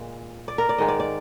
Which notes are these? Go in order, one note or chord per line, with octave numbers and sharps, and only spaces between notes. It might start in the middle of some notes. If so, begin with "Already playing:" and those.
Already playing: A#2 G#3
D5
A#4
D5
G#2 D#3 G#3 D#5
D5
D5